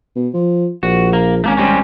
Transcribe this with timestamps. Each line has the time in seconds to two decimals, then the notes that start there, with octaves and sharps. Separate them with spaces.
0.16 B2
0.34 F3
0.83 A#1 F#4
1.13 A#3
1.44 G#1 A3 A#3 C#4
1.57 G3 C4 C#4